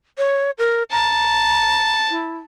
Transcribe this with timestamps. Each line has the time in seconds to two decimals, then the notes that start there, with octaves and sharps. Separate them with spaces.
0.18 C#5
0.58 A#4
0.92 A5 A#5
2.10 E4